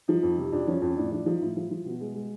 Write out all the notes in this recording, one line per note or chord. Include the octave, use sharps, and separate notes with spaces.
F3 D#4
F2
C3
F2 D4
F3 C#4
F2 C#4
A2 D4
F3 D4
F3 D#4
A2 E4
F3
F3
B2
G#3
G#3